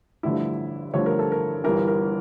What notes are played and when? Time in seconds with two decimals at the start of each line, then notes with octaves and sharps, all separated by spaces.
0.23 A1 G2 D3 F3 E4
0.94 A1 G2 D3 F3 C#5
1.06 A#4
1.19 A4
1.32 A#4
1.64 G1 G2 E3 A#4
1.88 A#4